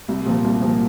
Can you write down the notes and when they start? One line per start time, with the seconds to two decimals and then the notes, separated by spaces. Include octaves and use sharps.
0.08 C2
0.25 A#2 F3 A#3
0.44 C2
0.61 A#2 F3 A#3